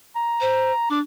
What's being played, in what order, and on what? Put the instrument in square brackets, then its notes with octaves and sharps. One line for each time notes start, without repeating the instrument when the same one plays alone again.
[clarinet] A#5
[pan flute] C5
[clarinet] D4 [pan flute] D6